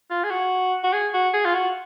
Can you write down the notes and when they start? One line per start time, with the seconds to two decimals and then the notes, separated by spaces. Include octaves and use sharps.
0.11 F4
0.24 G#4
0.30 F#4
0.84 F#4
0.93 G#4
1.14 F#4
1.34 G#4
1.45 F4
1.54 F#4